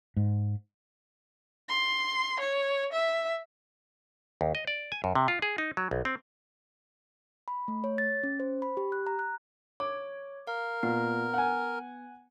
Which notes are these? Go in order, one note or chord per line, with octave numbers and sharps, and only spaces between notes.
G#2
C6
C#5
E5
D#2
D#5
D5
G#5
F#2
C3
F4
G#4
D#4
F#3
B1
C4
B5
A3
C#5
A6
C#4
C5
B5
G4
F#6
A#5
F#6
C#5 D6
A#4 F5
A#2 B3
F#5 G#5